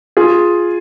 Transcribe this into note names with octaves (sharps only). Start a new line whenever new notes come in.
F4 G#4